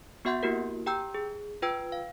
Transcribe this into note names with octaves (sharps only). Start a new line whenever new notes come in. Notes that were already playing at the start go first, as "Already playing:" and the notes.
B3 F#4 E5 F#5 C6 G6
A#3 E4 F#4 G4 A#4
G4 G5 A#5 E6 G6
G#4
F4 B4 G5 E6 G#6 D7
F5